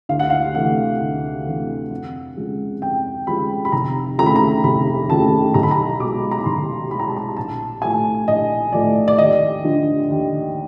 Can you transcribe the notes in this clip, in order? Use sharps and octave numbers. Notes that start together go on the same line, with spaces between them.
D2 F5
F#5
F5
C3 E3 A3 F#5
D2
C3 E3 A3
F2
C#3 F3 G#3
F2 G5
C#3 F3 G#3 B5
B5
F1 A#5
D#2 C#3 F3 A3 A#5
B5
A#5
F1 B5
D#2 C#3 F3 A3 A5
B1 A#5
B5
A#5
B2 G#3 D6
A#5
B5
B1 C6
B2 G#3 B5
A#5
A5
A#5
A#1 A5
A2 F3 A3 G#5
A#1 D#5
A2 F3 A3 D5
D5
D#2 D#5
D3 F3
D#2